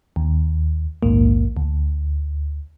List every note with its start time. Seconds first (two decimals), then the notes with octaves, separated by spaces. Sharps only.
0.16 D#2
1.03 A#1 D#2 G#2 A#3
1.57 D2